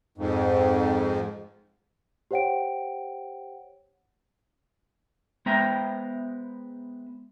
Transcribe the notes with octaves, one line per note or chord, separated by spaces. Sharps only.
F2 G#2
G4 C5 C#5 F#5 G5 D7
G#3 B3 C5 E5 G5 A#5